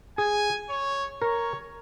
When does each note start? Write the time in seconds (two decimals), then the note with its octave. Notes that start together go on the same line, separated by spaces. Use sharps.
0.18 G#4 G#5
0.70 C#5
1.22 A#4 C#5